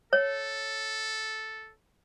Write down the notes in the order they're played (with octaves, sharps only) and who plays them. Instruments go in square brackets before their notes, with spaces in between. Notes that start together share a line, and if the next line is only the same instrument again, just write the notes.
[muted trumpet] A4 [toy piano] C#5